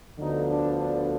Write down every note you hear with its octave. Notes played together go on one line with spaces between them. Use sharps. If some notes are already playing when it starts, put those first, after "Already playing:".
D2 D3 F3 B3 D#4
D4
D4